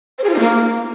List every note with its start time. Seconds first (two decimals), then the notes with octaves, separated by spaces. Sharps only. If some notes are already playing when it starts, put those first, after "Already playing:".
0.19 C5
0.24 G#4
0.29 F4
0.34 D#4
0.39 A#3